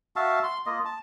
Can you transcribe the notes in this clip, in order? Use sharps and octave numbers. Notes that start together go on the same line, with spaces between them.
F#4 E5 F5 A5
C6
A#3 F4 D#5
A5